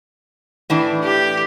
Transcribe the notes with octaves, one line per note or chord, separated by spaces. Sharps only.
A2 E3 D4
G4